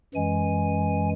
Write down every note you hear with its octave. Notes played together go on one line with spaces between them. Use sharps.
F#2 E3 G#3 G#5